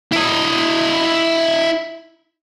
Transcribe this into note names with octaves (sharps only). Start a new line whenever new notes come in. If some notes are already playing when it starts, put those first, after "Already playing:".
E4 D#5